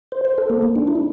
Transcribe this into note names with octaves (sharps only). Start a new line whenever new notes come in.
C5
C5
A4
A#3
A#3
D4
E4
D4